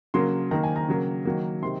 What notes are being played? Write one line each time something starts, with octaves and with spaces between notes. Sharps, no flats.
C#3 F#3 A#3 C6
D#3 A#3 A#5
G#5
A#5
C#3 F#3 A#3
D#3 F#3 A#3
C3 D#3 C6